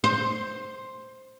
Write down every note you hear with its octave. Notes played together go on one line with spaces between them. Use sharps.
C5